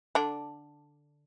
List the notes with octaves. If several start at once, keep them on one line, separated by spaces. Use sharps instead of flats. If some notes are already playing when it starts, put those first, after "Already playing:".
D3 D4